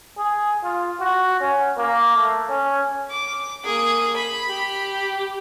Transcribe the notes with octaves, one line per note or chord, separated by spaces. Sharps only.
G#4
F4
F#4
C#4
A#3
A3
C#4
D6
A#3 G#4
B5
G4